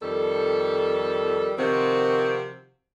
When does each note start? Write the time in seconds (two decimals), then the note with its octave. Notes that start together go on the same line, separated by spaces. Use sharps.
0.02 F2 D#3 G3 A4
1.58 C3 D#3 F3 C4 F#4